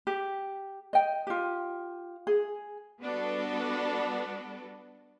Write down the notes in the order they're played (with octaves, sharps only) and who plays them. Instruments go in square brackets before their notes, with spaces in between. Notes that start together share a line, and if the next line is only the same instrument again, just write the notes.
[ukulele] G4
D#5 G5
F4 G4
G#4
[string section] G3 B3 D4 F#4 A4 B4